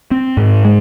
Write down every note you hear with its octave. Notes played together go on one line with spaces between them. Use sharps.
C4
G#2
G#3